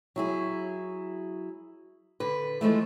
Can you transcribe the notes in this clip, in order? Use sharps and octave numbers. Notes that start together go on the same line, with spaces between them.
F#3 E4 G#4
D3 B4
E3 F3 G#3 A3